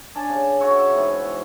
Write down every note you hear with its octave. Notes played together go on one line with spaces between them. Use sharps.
D4 G#5 A5
C#3
F#4 B4 C#5 E5
E5 G5
G#2 B2 E3